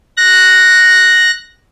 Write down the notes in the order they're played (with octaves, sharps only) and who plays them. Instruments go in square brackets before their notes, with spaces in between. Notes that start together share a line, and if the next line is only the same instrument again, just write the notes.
[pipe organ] F#6 A#6